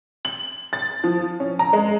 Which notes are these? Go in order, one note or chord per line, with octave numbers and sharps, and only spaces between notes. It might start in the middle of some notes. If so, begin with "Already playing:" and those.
F#7
A6
F3
C#4
A#5
G#3